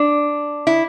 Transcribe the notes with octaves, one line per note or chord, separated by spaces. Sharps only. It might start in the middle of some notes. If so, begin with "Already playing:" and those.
Already playing: D4
E4